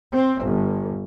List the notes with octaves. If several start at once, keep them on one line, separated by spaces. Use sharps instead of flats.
C4
G1